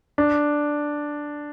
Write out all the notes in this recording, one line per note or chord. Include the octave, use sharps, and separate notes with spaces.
D4